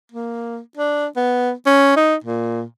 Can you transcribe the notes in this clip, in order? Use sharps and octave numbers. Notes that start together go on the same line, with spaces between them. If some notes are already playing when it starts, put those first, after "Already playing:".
A#3
D4
B3
C#4
D#4
A#2